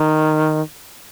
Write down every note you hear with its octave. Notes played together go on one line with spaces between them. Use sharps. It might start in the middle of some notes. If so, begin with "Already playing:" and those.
Already playing: D#3